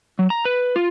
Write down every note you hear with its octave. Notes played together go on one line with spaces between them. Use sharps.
F#3
A#5
B4
F4